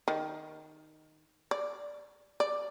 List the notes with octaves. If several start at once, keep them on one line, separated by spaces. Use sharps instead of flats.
D#3
D5
D5